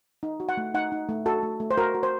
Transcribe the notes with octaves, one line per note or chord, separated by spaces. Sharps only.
D#4
F#4
F#5
A3
D#4 F#5
D#4
A3
F#4 A4
A3
A3
C5
F#4 A#4
F#4
C5